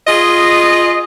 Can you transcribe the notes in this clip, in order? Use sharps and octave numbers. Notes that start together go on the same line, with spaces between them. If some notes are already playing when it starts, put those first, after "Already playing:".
F4 G#4 D#5